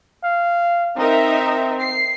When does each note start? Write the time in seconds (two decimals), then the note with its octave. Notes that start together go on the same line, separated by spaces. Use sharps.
0.23 F5
0.97 C4 D#4 A#4 E5
1.81 C7